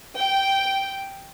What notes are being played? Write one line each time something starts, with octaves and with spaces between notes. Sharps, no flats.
G5